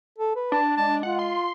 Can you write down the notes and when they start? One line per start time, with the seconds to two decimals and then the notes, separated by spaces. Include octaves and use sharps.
0.18 A4
0.36 B4
0.52 D4 A5
0.76 G#3 A5
1.03 F4 F#5
1.19 C6